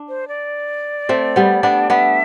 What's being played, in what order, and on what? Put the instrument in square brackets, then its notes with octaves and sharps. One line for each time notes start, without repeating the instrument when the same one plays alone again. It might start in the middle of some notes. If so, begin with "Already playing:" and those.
Already playing: [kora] D4
[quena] C5
D5
[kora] A3 C4
G3 B3
B3 D4
[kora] B3 D4 [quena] E5